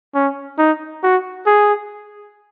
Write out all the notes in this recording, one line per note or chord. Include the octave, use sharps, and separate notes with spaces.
C#4
D#4
F#4
G#4